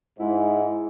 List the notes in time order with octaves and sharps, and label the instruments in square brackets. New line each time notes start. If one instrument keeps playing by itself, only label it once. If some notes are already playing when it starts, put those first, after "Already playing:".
[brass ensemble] G#2 [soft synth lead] E4